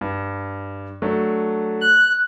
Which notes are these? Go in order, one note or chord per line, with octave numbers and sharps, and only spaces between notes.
G2
F#3 A3 D4
F#6